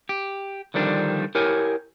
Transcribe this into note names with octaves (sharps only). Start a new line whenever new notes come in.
G4
D3 D#3 F3 G3 D4
E4 G4 A#4 C#5 G#5